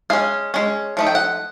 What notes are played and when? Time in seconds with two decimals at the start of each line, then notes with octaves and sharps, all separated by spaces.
0.10 G#3 C#4 F5
0.54 G#3 C#4
0.97 F3 A3 D#4
1.07 G5
1.15 F#5